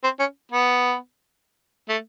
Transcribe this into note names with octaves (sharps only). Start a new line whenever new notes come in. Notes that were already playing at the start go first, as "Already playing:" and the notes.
C4
C#4
B3
A3